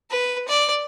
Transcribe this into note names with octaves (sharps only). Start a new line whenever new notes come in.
B4
D5